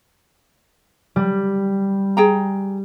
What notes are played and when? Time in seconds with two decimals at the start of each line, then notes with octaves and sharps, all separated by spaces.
1.16 G3
2.17 G#4 G5 A#5